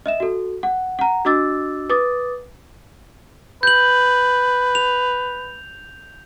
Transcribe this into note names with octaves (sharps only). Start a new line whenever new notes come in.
D#5 E5 E7
F#4 A4
F#5
F#5 A#5
D4 F#4 D#5 D6 E6 A6
B4 D6 D#6 A6
B4 G6 F#7
F7